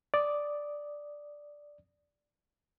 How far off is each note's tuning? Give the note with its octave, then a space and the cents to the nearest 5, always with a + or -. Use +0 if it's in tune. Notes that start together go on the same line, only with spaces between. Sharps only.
D5 +0 D#6 +0